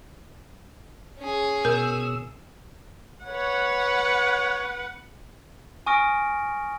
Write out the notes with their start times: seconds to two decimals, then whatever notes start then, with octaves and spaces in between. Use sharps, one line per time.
1.18 C#4 G#4
1.65 B2 A#4 E6
3.25 B4 C#5 F#5
5.86 G#5 C#6 D#6 F6 A#6 D7